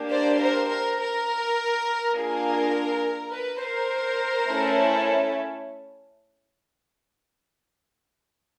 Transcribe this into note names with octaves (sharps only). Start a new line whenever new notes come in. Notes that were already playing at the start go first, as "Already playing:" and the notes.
Already playing: A#3 D4 G4
C5 D5
A#4 C5
A#4
A#4
A#3 D4 F4 G#4 A#4
B4
A#4 C5
A3 C#4 E4 A4